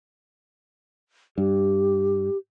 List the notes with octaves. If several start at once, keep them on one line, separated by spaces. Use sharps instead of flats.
G2 G4